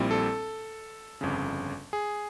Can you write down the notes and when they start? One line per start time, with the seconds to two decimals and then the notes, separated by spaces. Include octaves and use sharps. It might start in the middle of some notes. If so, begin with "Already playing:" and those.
Already playing: A#1 A#2 G3 C4 E4
0.11 A4
1.21 G1 F2 C#3
1.93 G#4